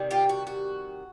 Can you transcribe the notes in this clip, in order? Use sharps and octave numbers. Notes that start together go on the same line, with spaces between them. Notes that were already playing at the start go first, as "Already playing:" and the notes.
Already playing: C3 D#3 G3
F4 G4
F#4
F#4